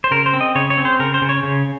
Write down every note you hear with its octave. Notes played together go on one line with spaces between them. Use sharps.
C5
C#3 A#4
C5
C4
D#5
C#3 C#5
C#5
C4
C5
C#3 A#4
C5
C#3
C#5
C#3